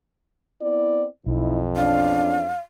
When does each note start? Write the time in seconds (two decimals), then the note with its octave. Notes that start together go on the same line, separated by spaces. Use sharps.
0.61 B3 C4 E4 D5
1.26 B1 F2 D#4 E4
1.76 E2 C#4 D4 F5